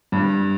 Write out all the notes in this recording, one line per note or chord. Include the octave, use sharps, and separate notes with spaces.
G2